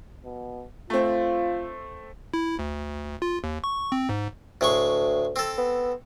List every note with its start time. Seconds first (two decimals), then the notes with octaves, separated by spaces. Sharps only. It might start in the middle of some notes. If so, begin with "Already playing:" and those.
0.25 B2
0.90 A3 C4 F4
2.34 E4
2.59 D2
3.22 F4
3.44 D#2
3.64 C#6
3.92 C4
4.09 G#2
4.61 D2 A2 G#3 C#6
5.36 C4 A4
5.58 B3